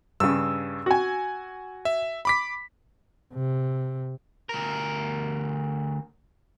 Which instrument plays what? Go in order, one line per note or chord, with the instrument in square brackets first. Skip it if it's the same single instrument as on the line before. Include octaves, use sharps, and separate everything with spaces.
[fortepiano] G2 C#3 [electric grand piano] E6
[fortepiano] F#4 G#5
[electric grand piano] E5
B5 D6 B6
[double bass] C3
[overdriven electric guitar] D2 A#4